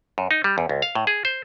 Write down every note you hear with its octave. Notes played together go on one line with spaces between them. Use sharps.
F#2
D#4
G3
E2
C#2
F5
A2
G#4
C5